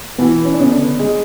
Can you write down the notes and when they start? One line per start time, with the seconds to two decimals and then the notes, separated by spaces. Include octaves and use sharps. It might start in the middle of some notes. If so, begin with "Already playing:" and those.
0.18 B2 E3 B3
0.45 C#4
0.54 D4
0.59 C#3 B3 C#4
0.72 D3 D4
0.99 G#3